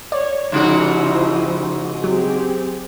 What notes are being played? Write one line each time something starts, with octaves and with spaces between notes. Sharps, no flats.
C#5 D5
G#2 C#3 F3 E4 F#4 G4
F#3 C4 G4 G#4